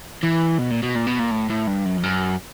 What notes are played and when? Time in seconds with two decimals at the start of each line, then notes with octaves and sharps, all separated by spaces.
0.23 E3
0.59 B2
0.71 A#2
0.83 B2
0.96 A#2
1.07 B2
1.19 A#2
1.31 A2
1.50 A2
1.67 G2
1.85 F#2
1.98 F2
2.03 F#2